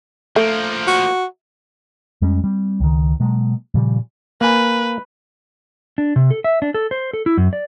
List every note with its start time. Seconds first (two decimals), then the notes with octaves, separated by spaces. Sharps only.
0.36 F3 A3 A#3
0.87 F#4
2.22 F2 G3 G#3 C#4
2.44 G3 C4
2.80 C#2 D#3
3.20 B2 F#3 G#3 A#3
3.74 A#2 C#3 F3 G3
4.41 A#3 B4 G#5
5.98 D4
6.16 C3
6.31 A4
6.44 E5
6.62 D4
6.74 A4
6.91 C5
7.13 A4
7.26 E4
7.37 F#2
7.53 D5